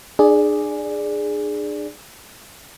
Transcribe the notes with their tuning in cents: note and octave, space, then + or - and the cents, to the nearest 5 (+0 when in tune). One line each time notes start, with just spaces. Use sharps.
D4 +40 G#4 +0 D5 +0